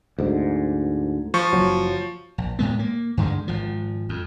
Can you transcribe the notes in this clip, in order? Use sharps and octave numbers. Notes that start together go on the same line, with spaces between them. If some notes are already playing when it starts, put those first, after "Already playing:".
D2 G#2
F3 C#6
F#1 F#3
A#1
A2 G#3 B3
A#3
G2 D3 D#3 G#3
G#1 F3
F2